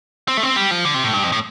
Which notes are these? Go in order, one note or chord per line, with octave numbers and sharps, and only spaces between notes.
C4
A3
C4
G3
F3
D3
C3
A2
G2
F2
A2